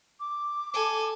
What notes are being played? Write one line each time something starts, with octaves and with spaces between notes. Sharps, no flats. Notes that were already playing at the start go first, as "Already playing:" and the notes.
D6
A4 G#5